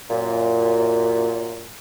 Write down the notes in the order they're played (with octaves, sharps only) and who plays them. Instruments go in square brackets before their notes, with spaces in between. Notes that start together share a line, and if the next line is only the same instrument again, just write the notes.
[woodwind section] F#2 A#2